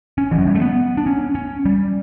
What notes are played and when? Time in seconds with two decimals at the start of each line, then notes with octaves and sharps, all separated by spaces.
0.18 C#4
0.31 E3
0.38 F#3
0.47 G3
0.55 A3
0.61 B3
0.97 D4
1.06 C#4
1.35 C#4
1.65 G3